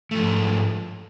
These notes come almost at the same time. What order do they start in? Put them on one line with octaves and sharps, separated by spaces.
A3 F3 G#2